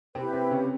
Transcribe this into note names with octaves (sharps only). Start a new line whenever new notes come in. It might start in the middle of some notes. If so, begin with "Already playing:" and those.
C3 C4 E4 G4 B4
C3 C4
C#3 C#4